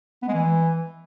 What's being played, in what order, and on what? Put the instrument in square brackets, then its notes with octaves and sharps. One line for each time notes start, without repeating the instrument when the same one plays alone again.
[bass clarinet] B3
G#3
E3